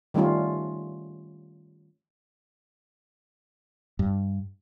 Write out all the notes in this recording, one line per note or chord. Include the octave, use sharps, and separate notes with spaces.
D#3 G3 A3 C#4 F4
G2